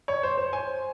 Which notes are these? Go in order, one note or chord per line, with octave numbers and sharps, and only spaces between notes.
C#5
C5
C5
G#5